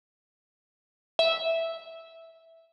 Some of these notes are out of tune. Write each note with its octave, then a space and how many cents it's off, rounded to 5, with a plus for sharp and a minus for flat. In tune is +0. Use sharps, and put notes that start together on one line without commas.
E5 -5